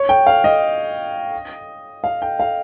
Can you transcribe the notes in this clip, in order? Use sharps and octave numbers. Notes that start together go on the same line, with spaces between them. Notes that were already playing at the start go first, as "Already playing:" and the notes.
Already playing: C#5
G5
F5
D#5
F5
G5
F5